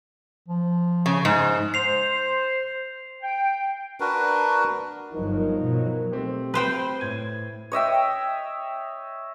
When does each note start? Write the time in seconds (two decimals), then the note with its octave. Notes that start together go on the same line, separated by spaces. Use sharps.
0.48 F3
1.06 C#3
1.25 G#2
1.74 C5 C7 F7
3.22 G5
4.00 D4 F#4 A#4 B4
5.12 G1 F3 F#3 D#4 A#4
5.60 B2 F#3
6.12 A3 C4 G4
6.54 B4 C5 G5
7.00 A2 G#6 D#7
7.72 C#5 D#5 E5 G5